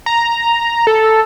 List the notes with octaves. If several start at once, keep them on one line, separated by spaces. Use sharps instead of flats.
A#5
A4